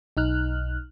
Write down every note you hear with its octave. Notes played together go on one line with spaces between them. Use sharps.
B1 D#4 F6 F#6